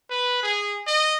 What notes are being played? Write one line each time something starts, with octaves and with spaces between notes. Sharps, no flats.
B4
G#4
D#5